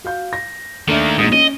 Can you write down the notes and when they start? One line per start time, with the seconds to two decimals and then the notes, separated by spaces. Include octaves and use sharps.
0.04 F#4 F5 G6
0.33 A#6
0.88 D#3 A3 A#3 D4 E5
1.18 A#1 G#2 D#4 D#6
1.32 C#4 D#5